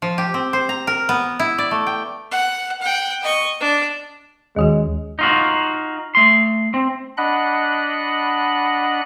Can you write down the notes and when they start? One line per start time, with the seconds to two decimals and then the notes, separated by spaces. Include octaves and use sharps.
0.02 F3
0.18 G4
0.34 C4
0.53 C5
0.69 A#5
0.87 A#4
1.09 B3
1.40 E4
1.58 D5
1.71 A3
1.87 G5
2.31 F#5
2.81 F#5 G5
3.23 D#5 C#6
3.61 D4
4.56 D#2 D#3 G#3 F#4
5.19 D#4 F4 F#4
6.15 A3 C6
6.74 C4
7.17 D4 D#5 F#5 B5 F#6